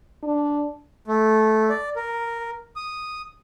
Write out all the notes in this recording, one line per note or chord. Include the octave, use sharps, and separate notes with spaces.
D4
A3
D5
A#4
D#6